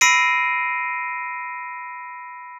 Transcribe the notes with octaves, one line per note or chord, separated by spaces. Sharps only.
B5 E6 A#6 C7 D7 D#7